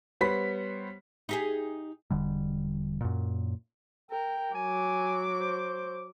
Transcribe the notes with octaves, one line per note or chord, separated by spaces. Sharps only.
G3 B3 C5 C#5 B5 B6
D#4 G4 G#4
E1 D3 G3
F#2 A#2
A#4 G5
F#3 G#5 D6
C5